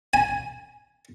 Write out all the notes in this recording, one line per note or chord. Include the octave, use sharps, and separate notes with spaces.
G#5